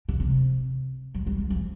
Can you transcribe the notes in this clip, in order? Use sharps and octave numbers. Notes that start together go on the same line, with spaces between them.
D3
C3
F#3
G3
F#3
F3